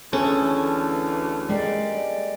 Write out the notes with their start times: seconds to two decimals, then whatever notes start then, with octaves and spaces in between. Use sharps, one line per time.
0.13 D2 E3 C#4 G#4 A4
1.49 G3 G#3 A#3 D5